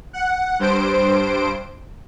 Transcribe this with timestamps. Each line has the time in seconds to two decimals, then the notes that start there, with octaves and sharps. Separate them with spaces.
0.13 F#5
0.59 G2 C5 D7